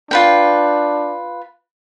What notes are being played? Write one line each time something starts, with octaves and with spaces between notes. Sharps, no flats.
D4 F4 B4 G5